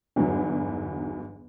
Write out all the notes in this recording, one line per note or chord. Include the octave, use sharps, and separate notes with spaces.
G1 E2 G#2 D3 F#3